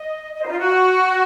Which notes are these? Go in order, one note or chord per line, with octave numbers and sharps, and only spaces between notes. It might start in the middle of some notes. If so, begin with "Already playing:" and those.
Already playing: D#5
D#5
C5
D#4
F4
F#4